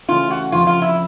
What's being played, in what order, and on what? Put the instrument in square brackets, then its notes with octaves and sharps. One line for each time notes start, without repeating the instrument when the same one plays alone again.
[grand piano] C#3 E3 A3 C#4 [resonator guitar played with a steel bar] F4
[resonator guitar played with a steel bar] F#4
[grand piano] F2 C#3 F3 [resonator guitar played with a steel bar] F4
[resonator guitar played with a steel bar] F4
E4